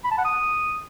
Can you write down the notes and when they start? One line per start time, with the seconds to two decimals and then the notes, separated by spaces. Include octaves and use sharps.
0.04 B5
0.11 A5
0.18 F#5
0.25 D#6